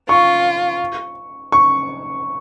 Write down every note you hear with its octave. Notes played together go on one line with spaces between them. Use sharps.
F4 C#6
C#6